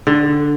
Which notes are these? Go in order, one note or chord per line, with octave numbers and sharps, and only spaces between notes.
D3